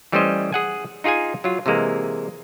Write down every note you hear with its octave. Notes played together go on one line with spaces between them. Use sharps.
E3 G3 A3 C#4 C5 D#5
G#4 F#5 G#5
D#4 F4 G#4 F5 G#5
F#3 F4
C3 E3 G#3 A#3